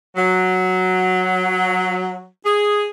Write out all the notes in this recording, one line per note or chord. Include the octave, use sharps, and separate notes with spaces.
F#3
G#4